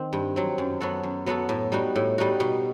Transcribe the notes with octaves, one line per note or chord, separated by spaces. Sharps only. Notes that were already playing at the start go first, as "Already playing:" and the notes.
Already playing: D#3 C4
G2
F#3 C4
F#2
F#3 B3 F#4 A4
F#2
F#3 B3 F#4 A4
A2
G3 D#4 F#4
A2
G3 D#4 F#4
B2